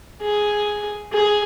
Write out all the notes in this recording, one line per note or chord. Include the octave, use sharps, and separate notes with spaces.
G#4
G#4